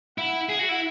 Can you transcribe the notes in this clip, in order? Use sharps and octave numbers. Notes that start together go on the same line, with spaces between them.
E4 F#5
G#4 F#5
F#4
E4